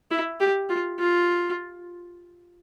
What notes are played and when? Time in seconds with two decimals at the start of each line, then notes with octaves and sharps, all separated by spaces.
0.11 E4
0.40 G4
0.69 F4
0.99 F4